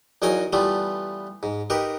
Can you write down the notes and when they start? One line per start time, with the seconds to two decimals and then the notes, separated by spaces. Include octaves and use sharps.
0.22 E2 F#3 D#4 A#4 D#5 G#5
0.53 E3 G3 A3 B3 F4
1.43 G#2
1.70 D#4 G4 A#4 B4